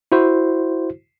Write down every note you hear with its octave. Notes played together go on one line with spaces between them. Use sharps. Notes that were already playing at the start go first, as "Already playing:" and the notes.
E4 F#4 C5